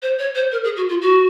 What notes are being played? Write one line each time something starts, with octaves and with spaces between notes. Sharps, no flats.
C5
C#5
C5
A#4
G#4
F#4
F4
F#4